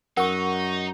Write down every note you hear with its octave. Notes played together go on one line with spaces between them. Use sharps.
F#2 D#4 A#4 F#5 C#6